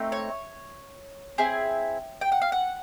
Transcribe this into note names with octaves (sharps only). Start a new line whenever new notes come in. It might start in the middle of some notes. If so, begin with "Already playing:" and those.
Already playing: A3 C4 D#4
C#5
C4 E4 G#4
G5
F#5
F5
F#5